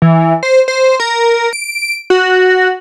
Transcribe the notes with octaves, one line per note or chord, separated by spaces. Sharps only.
E3
C5
C5
A#4
D7
F#4